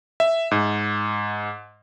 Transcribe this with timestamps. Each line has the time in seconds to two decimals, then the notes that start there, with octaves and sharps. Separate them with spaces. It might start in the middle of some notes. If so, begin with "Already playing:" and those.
0.20 E5
0.51 G#2